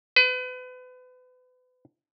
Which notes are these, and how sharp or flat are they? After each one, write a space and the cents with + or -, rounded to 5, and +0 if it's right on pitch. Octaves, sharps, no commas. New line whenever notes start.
B4 +35